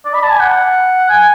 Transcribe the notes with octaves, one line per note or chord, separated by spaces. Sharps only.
D5
B5
A5
G#5
F#5
G#5